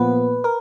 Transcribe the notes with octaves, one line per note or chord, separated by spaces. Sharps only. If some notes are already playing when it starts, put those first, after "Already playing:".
Already playing: A#2 F3 B3 B4
A#4